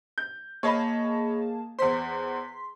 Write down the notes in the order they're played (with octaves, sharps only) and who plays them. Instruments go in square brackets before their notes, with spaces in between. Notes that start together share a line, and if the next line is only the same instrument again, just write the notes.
[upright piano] G6
[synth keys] A#3 G#4 A5 [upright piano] C#5 D#5 B5
[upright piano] E2 C5 [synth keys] C6 B6